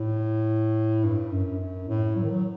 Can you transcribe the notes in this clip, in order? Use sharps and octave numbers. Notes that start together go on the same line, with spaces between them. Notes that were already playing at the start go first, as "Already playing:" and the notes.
Already playing: A2
G2
F#2
F#2
A2
F#3
D#3
F#3